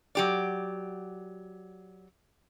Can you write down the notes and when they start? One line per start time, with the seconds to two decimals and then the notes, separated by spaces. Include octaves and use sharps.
0.15 F#3 G4 D5